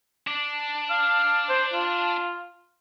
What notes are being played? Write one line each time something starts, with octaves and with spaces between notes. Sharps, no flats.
D4
F5
C5
F4